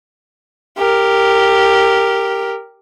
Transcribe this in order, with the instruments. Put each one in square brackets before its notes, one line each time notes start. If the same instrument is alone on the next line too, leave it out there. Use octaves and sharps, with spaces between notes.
[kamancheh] G4 A#4